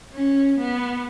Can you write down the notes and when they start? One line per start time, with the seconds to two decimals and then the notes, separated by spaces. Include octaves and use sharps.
0.14 C#4
0.59 B3